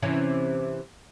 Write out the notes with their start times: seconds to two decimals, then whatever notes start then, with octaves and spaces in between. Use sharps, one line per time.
0.02 C3 E3 C#4